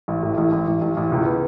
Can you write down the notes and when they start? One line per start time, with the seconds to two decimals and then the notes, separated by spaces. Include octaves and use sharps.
0.08 A1
0.23 A2
0.37 A1
0.52 A1
0.67 A1
0.81 A1
0.97 A1
1.12 C#2
1.25 B3